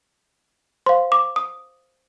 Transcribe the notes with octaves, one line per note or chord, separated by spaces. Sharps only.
C5 F5 C6
D6
D#6